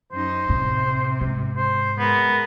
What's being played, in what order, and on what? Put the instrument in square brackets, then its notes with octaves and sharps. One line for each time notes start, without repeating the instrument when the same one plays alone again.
[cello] F#2 D#4 [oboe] C5
[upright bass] A2 [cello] C3
[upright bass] G#2
[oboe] C5
[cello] G#3 A#4 [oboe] B3